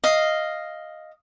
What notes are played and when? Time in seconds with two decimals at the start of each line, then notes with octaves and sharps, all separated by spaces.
0.04 D#5 F5